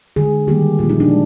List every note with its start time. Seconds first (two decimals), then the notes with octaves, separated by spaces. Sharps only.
0.16 D3 G#3 G#4
0.47 D#3 G3 A#3 G4
0.79 A#2 F3 A#3 F4
0.90 D#4
1.00 D4
1.09 G#3